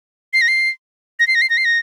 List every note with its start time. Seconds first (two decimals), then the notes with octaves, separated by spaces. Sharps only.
0.33 C7
0.41 A#6
0.48 C7
1.19 A#6
1.27 C7
1.35 A#6
1.41 C7
1.50 A#6
1.57 C7
1.65 A#6